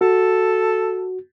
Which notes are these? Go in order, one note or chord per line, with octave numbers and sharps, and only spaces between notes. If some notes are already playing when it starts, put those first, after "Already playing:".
F#4 A4